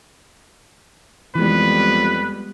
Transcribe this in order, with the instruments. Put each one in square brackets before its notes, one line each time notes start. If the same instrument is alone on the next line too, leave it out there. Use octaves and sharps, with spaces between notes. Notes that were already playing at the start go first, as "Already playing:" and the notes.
[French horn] F2 [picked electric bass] E3 [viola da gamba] G3 G#3 B3 [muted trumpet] B4